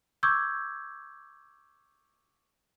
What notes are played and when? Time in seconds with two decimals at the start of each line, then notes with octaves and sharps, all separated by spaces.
0.23 C#6 D6 E6 G6 G#6